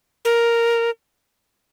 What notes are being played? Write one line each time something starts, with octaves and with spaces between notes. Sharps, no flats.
A#4